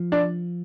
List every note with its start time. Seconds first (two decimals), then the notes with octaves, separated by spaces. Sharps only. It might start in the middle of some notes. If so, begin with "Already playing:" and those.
Already playing: F3
0.12 D4